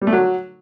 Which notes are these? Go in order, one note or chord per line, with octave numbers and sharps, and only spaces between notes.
G3
A3
F#3